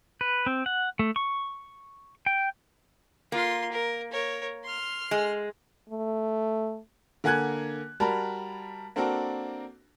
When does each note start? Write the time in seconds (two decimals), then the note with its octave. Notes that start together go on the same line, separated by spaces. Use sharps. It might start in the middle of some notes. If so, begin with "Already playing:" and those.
0.21 B4
0.46 C4
0.66 F#5
0.99 A3
1.16 C#6
2.26 G5
3.32 A#3 F4 C6
3.72 A#4
4.12 A#4 C#5
4.64 C6 F6
5.11 G#3
5.90 A3
7.24 D3 A#3 F#5 G#5 F#6 G#6
8.00 G3 F#4 A#4 A5 B5
8.96 A#3 C4 D4 F#4 A4 A#4